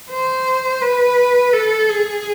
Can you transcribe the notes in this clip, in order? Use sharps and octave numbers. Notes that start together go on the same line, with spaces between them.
C5
B4
A4
G#4